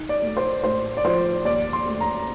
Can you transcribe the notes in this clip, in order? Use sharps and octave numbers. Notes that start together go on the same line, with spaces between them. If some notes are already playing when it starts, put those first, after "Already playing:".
Already playing: D#4
D5
A3
C5
A2 C5
D5
F3 C5
D#2 D5
C6
A3
A#5